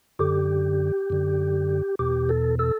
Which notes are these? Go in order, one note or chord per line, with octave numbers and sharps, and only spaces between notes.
F#2 D3 G4
F#2 D3
E2 B2 G4
A4
A4